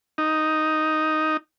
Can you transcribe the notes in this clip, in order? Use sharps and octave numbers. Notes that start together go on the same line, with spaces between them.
D#4